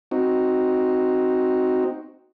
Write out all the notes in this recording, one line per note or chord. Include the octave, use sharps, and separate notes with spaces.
C4 D#4 F#4